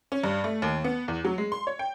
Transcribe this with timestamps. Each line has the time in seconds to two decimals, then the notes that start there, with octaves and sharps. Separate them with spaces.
0.12 C#4
0.24 G2
0.44 A3
0.62 D#2
0.84 B3
1.08 E2
1.25 F#3
1.38 G#3
1.52 C6
1.67 C#5
1.79 G5